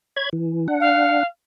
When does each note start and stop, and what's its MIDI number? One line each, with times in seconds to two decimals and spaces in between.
0.16 0.29 73
0.16 0.29 83
0.16 0.29 92
0.33 0.67 52
0.68 1.23 62
0.68 1.23 78
0.80 1.26 77